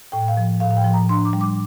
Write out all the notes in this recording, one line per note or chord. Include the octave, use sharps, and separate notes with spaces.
A2 G5
F5
F3
A2 F5
F5
G5
F3
A#5
D4 C6
D6
G3
D6